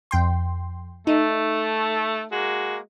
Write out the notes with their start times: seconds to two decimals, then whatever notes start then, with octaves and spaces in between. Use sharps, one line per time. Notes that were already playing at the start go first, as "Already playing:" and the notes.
0.11 F2 G5 C6
1.07 A3 D#4
2.31 G#3 A#3 F#4